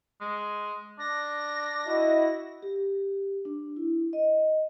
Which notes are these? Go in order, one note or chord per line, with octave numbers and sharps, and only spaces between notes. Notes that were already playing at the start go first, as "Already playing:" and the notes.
G#3
D4 A#6
E4 F#4 D#5
G4
D4
E4
D#5